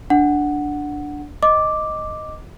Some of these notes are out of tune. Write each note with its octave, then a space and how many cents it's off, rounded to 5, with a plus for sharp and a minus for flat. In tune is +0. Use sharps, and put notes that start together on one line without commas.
D4 +0 F#5 +0
D#5 +0 D6 +0